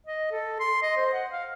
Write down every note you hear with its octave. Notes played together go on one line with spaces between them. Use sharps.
D#5
A4
C6
D#5
C5
F#5
F5